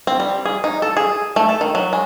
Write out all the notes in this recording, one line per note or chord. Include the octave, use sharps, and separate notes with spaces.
C4
G3
G#4
D#4
A4
G#4
A3
A4
D#3
F#3
G#3